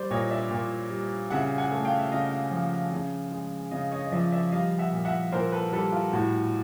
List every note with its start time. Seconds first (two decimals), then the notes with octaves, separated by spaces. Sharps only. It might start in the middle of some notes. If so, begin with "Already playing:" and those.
Already playing: G3 C5 D5
0.11 A#2 C#5 D#5
0.31 D5 E5
0.51 A#2
0.91 G3
1.30 C#3 E5 F#5
1.58 F#5 G#5
1.72 A3
1.84 F5 G5
1.99 E5
2.11 C#3 D#5 F5
2.51 F3
2.92 C#3
3.31 G#3
3.71 C#3 D#5 F5
3.91 C#5 D#5
4.06 D#5
4.12 F3 D5 E5
4.32 D5 E5
4.52 G3 D#5 F5
4.79 E5 F#5
4.92 A#2
5.05 E5 F#5
5.32 A#2 A#4 C5
5.52 A4 B4
5.73 G3 A4 B4
5.93 F4
6.12 A2 F#4